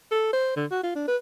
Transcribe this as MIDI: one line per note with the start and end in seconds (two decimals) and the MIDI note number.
0.11 0.33 69
0.33 0.54 72
0.56 0.65 50
0.71 0.80 66
0.83 0.94 65
0.95 1.07 62
1.08 1.16 71